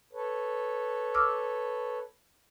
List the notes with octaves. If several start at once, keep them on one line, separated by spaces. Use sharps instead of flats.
A4 B4 C#5
D6 E6 F6